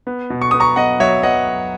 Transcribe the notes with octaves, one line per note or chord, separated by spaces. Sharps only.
B3
B2
C#6
B3 D#6
A#5 C#6
B3 D#5 F#5
F#3 C#5 E5
B3 D#5 F#5